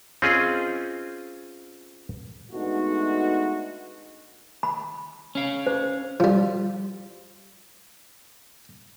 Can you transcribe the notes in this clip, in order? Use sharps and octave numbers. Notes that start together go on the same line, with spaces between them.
C4 C#4 F4 G#4 D#5
G#3 A3 B3 D4 D#4 F#4
B5
C#4 F5
C5
F3 G3